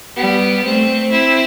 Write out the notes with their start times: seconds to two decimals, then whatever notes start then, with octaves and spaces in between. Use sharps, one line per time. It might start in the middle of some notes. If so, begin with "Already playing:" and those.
0.15 G3 B3
0.64 A3 C4
1.12 C4 E4